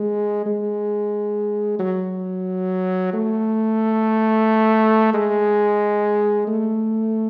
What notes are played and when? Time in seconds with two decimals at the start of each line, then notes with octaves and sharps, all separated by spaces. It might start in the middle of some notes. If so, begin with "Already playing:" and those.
Already playing: G#3
0.46 G#3
1.79 F#3
3.14 A3
5.14 G#3
6.48 A3